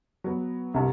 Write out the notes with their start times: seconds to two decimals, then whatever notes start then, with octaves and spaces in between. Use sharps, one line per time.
0.24 F#3 B3
0.74 C2 G2